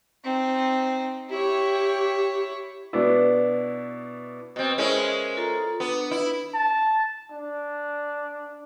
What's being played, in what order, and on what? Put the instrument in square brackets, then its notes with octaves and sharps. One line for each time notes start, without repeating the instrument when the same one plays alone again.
[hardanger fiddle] C4 D#4
[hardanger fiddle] E4 C#5 [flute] G4
[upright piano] B2 B3 D4 E4
[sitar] B2 C4
[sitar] G#3 C#4 E4 [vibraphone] A#4 C5
[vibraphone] F4 A4 A#5
[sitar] B3 [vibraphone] D4
[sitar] E4
[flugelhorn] A5
D4